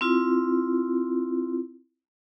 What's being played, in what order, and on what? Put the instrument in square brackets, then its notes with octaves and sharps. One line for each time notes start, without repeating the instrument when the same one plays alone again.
[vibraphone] C4 E4 F4